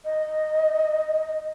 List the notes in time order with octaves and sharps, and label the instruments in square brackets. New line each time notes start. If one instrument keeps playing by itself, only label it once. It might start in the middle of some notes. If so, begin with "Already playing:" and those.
[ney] D#5